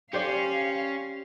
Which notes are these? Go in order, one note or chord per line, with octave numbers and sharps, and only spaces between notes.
C#4 G4 C5 D5 F5